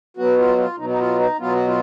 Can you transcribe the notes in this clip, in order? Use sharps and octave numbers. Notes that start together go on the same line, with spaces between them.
B2 F#3 B3 F#4
F4
F#4
F4
B2 F#3 B3 D#4
D#4
F4
D#4
B2 F#3 B3 F4
F#4
F4